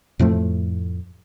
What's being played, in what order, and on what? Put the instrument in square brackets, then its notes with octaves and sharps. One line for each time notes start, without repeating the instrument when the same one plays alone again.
[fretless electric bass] F2 A2 F3 A3